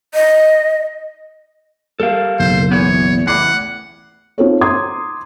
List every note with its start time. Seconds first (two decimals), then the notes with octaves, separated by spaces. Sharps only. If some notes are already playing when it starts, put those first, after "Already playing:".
0.14 D#5
2.00 G3 A4 A#4 F5
2.39 F#1 B1 C5
2.71 E3 B3 C#5
3.27 E2 A2 F#5 B5 D6 C7
4.38 C4 D#4 F4 F#4 A4 C#5
4.61 A#5 C6 D6 D#6 G#6